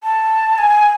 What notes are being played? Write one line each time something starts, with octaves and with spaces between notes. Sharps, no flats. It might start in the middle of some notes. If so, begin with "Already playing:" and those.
A5
G#5